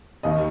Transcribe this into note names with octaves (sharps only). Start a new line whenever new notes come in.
D#2 D#5